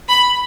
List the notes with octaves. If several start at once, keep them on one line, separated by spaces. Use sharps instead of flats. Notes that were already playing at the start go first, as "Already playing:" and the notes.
B5